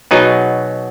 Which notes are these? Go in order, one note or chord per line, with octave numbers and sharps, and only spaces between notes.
B2 F#3 B3 D#4 G#4